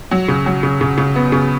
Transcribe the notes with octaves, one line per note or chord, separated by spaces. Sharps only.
F#3
C#3
F#3
C#3
C#3
C#3
B3
C#3